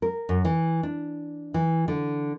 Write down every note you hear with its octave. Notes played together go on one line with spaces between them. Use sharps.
A#4
F#2
E3
D4
E3
D3